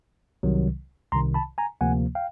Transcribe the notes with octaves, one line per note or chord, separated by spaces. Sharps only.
C2 C3 D#3 F#3
C2 C3 D#3 A#5 C6
A5 B5
G#5 A#5
D2 C3 F3 A#3 F#5 G#5
F5 G5